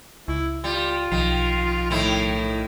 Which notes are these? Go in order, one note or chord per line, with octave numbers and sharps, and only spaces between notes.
C#2 E4
G3 F4
B1 D#3 F3
A2 D#3 E4